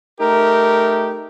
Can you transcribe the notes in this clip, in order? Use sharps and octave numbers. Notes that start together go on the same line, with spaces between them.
A3 D#4 G4 A#4